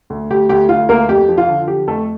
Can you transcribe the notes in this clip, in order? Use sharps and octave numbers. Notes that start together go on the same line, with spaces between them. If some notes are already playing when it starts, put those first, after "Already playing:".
D2
D2 G4
D2 G4
D2 F4
D2 A#3 A#4
F2 G4
F3
F4
D3
F3 G4
F2 A3 A4